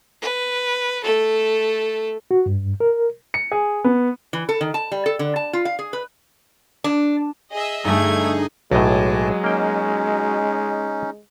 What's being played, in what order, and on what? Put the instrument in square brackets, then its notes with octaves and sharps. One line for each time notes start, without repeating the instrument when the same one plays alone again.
[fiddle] B4
A3 A4
[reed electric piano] F#4
G2
A#4
[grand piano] C#7
G#4
B3
[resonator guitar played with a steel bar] E3
A4
D#3
A5
G3
A4
D3
A5
F4
F5
G#4
B4
D4
[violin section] G#4 D#5 E5
[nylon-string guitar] G2 D3 [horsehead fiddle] A3 [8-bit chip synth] D#4 G#4 [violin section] G#6
[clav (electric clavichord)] B1 A2 [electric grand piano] F#3 D#5 [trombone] G#3 [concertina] G#5 A5 D6
[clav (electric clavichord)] A#3 G5 [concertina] C#4 D#4